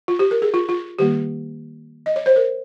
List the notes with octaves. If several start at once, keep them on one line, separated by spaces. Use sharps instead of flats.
F4
G4
A#4
G#4
F4
F4
D#3 G3 A#3 G4
D#5
C#5
C5
A#4